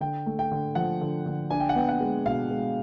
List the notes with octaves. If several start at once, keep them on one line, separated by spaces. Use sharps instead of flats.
D3 G5
A3
G5
D3
F3 F#5
D3
D3
D4 G#5
G5
F#5
B3 G5
F#5
G#3
B2 F5
G#3